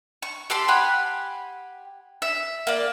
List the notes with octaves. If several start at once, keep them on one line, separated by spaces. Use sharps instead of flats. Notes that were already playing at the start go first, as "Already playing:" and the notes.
C#6
G4 A4 C6 D6
G4 F#5 G#5 B5
E5
A#3 D5